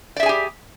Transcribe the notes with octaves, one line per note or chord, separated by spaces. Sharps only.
G4 G#4 D5 E5 G#5